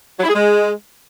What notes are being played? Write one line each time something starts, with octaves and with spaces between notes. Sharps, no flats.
F#3
E4
G#4
G#3